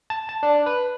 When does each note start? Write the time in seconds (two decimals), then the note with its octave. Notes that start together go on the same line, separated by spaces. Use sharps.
0.10 A5
0.29 A5
0.43 D4
0.66 B4